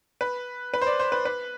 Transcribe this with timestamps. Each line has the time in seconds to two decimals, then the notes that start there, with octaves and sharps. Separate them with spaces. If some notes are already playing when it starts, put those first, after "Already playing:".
0.21 B4
0.74 B4
0.82 C5
0.87 D5
0.99 C5
1.12 B4
1.25 B4